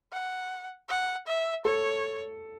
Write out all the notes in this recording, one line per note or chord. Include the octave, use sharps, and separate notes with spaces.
F#5
F#5
E5
A4 C#5